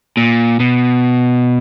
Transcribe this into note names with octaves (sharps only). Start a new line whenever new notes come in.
A#2
B2